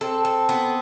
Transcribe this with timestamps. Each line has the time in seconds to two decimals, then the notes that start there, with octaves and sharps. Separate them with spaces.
0.01 C4 A4
0.25 A4
0.49 B3